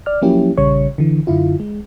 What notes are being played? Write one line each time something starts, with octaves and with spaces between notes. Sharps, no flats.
D5 F6
F3 F#3 A#3 C#4 E4 G4
A#1 C#3 G3 C#5 C#6
D3 E3
F#2 D3 E4 F4
G#3